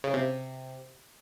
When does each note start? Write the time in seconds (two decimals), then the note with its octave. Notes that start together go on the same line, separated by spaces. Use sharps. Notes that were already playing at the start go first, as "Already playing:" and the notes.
0.04 C#3
0.14 C3